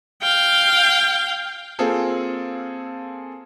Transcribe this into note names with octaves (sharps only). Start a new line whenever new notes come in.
F5 G5
A#3 C4 F4 G#4 A4